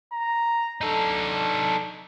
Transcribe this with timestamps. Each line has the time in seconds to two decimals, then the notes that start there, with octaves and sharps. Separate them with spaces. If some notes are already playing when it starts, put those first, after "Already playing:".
0.13 A#5
0.81 D4 D#4 A4